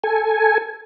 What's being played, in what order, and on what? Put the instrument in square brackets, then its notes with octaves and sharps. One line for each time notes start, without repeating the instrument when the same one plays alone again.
[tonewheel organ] A4 G#5